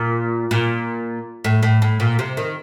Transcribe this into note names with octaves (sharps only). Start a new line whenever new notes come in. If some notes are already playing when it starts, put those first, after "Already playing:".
Already playing: A#2
A#2
A2
A2
A2
A#2
C3
D#3